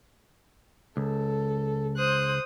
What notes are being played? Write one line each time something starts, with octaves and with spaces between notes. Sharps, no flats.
C#2 A4
C5 D#6 F#6